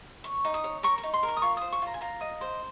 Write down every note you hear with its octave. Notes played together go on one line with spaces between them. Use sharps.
C#5 C#6
D#4
D#6
C#5
A#4 C#6
C#6
D#4
C6
A#4
C#6
D#6
F4 C#6
C5 D#6
C#6
F4 A#5
G#5
F4 A#5
D#5
C5